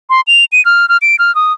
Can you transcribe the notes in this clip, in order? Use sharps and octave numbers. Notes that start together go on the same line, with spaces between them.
C6
F7
D#7
F6
F6
D7
F6
D#6